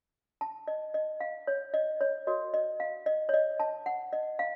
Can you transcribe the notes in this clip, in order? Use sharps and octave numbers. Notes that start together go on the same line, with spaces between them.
A5
D#5
D#5
F5
C#5
D#5
C#5
F#4 A#4 C#5 D#5
D#5
F5
D#5
C#5
D#5
A5
F#5
D#5
F5